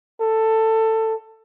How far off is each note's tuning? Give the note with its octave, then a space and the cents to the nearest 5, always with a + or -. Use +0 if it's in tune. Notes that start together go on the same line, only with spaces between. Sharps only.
A4 +15